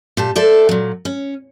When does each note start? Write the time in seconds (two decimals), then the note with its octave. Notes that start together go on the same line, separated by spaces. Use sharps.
0.17 A#2 G4 A5
0.36 A4 C5 D5 E5
0.69 A#2 F#3
1.05 C#4